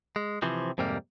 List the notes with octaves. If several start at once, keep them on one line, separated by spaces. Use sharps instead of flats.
G#3
C3 E3 F3 C4
F2 G#2 C3 G3 A#3